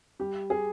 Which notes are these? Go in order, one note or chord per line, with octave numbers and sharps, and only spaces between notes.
G3 G4
G#4